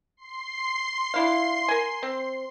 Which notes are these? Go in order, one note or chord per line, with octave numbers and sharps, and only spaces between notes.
C6 C7
D4 E4 F5
A#4 G#5
C4